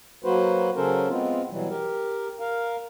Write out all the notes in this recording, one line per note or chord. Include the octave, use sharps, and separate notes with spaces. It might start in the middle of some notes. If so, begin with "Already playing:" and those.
F#3 A#3 F#4 B4 C5
C#3 F#3 C#4 A4 A#4 C5
G#3 B3 C4 F4
B2 E3 F#3 G3
G4 A#4
A#4 F5